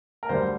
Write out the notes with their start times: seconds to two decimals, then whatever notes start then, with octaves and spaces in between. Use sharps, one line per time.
0.23 A#4
0.29 D2 D3 G3 C5